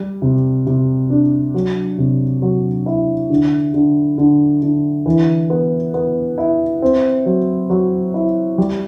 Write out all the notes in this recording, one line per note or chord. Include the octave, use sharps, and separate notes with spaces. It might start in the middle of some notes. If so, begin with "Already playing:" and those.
Already playing: G3
C3
C3
D4
F#3
C3
F#3
E4
D3
D3
D3
D3
E3
B3
B3
E4
C4
F#3
F#3
E4
G3